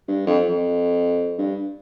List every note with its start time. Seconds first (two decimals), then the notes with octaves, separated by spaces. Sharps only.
0.08 G2
0.27 F2
0.49 F2
1.38 G2